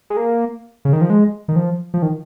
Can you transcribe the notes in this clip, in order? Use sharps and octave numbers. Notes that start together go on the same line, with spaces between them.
G#3
A#3
C#3
D#3
F3
G#3
D#3
F3
F3
D#3